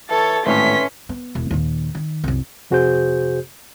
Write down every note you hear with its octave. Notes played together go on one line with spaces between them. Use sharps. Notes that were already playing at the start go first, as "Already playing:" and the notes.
E3 A4 C#5 A6
G#1 A2 E3 C#4 C6 B6
B3
E1
D#2 A#2
D#3
C2 F#2
F2 C3 F#4 G#4 C5 G6